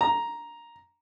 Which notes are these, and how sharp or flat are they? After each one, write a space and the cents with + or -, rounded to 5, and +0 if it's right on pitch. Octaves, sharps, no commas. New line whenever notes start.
A#5 +5